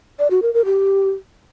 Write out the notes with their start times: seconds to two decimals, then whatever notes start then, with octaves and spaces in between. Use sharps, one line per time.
0.19 D5
0.31 F#4
0.42 A#4
0.54 A#4
0.65 G4